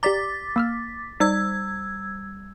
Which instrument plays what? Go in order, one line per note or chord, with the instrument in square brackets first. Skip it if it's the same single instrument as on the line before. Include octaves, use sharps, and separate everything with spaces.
[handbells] G4 D5 A#5 [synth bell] D6 A6 B6
[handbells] A#3 E6 F6
[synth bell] G3 E6 G#6 [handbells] D#4 D5